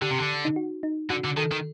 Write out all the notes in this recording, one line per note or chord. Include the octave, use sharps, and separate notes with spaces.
D3 G4
C3
D3
D#4
F#4
D#4
D3 F#4
D3
D#3 A4
D#3